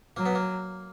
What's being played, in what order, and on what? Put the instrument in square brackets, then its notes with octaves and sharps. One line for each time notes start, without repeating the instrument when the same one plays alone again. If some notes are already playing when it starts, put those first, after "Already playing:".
[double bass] F#3 [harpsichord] A#3
[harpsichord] B3
A#3